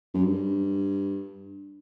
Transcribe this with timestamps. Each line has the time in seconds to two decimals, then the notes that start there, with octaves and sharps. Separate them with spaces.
0.14 F#2
0.24 G2